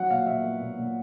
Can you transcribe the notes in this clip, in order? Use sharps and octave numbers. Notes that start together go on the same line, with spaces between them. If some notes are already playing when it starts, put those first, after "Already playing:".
Already playing: F#3 F#5
A#2 F5
A#2 E5
B3
A#2
A#2